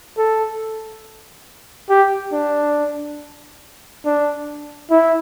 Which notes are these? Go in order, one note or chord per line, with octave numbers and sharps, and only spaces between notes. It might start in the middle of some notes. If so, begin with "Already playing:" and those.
A4
G4
D4
D4
E4